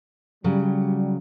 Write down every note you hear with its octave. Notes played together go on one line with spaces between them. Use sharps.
C#3 F#3 G3